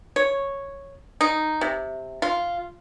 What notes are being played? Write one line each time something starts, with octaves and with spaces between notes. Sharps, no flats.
C#5
D#4
C3
F4